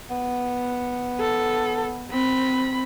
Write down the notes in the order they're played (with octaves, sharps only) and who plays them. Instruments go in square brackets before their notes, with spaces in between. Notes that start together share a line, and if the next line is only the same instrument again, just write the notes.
[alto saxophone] B3
[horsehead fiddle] A4
C4 B5